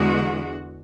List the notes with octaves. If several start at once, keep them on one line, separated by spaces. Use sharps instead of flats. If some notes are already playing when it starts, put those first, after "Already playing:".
Already playing: E2 D3 G#3 F#4